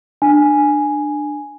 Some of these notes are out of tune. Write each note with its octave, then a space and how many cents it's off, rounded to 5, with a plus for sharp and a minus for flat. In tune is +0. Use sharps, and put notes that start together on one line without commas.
D4 +20 G#5 +0